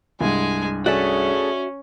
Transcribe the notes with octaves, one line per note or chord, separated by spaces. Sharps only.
C2 G2 G#3 G#5
A3 C#4 F#4 G#4 D5 E5